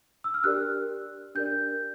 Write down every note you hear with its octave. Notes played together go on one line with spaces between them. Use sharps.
E6
F6
D4 G4 A#4 D5 F#6
D4 G4 A#4 D5 G6